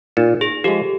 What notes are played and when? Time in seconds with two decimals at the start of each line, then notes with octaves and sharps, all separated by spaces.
0.17 A#2 D#4
0.41 G#4
0.64 F3 G#3 G4 A4